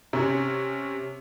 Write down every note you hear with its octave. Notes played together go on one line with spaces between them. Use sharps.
C3 C#4